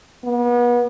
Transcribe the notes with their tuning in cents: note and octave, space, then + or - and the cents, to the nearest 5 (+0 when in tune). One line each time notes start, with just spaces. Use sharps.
B3 -35